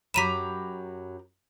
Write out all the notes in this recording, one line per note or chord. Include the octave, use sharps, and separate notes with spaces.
F#2 F#3 G4 A#5 B5 B6 D#7 E7